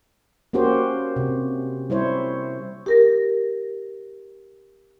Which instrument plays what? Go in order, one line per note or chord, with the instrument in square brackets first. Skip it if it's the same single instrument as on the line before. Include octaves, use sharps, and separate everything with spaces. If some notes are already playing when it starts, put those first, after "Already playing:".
[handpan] A#3 C#4 F#4 G4 C5
C3
G3 E4 C5 C#5
[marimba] G4 A#4 A#6